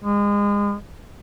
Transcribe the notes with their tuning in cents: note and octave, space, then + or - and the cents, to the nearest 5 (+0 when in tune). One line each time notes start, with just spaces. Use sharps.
G#3 -30